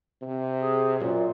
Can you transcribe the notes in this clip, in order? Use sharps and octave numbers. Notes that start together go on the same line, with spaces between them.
C3
G#4
F#2 A#2